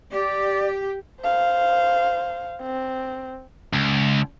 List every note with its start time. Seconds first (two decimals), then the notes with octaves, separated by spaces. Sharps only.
0.12 G4 D5
1.21 C5 F5
2.61 C4
3.73 C#2